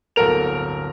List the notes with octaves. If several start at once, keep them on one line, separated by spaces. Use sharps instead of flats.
D1 G1 A4 A#4 F7